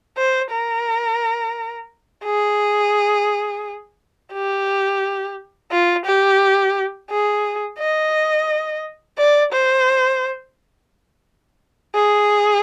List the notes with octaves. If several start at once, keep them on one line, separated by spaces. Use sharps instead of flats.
C5
A#4
G#4
G4
F4
G4
G#4
D#5
D5
C5
G#4